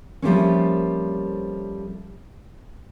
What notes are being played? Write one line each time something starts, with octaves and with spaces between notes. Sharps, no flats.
F3 G3 A3 A#3 C4 C#4